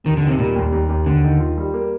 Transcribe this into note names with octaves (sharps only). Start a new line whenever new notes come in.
D#2 D#3
D3 D#3
C3
A#2 G3
D#2
D#2
D#2
D#2 D3
D#3
F4
G3
A#3